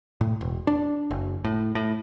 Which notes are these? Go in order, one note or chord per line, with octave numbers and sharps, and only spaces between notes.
A2
E1
D4
F#1
A2
A2